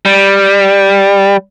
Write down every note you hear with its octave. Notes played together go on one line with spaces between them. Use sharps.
G3